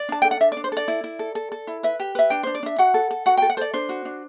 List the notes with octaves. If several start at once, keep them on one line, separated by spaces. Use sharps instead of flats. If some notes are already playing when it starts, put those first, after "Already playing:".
Already playing: D5
D4 A5
A4 G5
F#5
D4 E5
D4 D5
C5
A4 D5
E4
E4
A4
A4
A4
E4
B4 E5
G4
B4 E5
D4 G5
D4 C5
D5
D4 E5
F#4 F#5
A4
A4
F#4 F#5
A4 G5
F#5
A4 C5 D5
D4 C5
F#4
D4